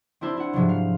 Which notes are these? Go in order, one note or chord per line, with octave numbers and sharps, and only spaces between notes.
C4 D4 E4 C5
E4 F#5
G#2 C3 F3 F#3
F5